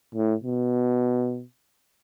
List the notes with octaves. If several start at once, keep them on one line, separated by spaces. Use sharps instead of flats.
A2
B2